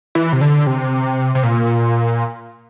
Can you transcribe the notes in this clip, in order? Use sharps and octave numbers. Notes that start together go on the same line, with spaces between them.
E3
C3
D3
C3
C3
A#2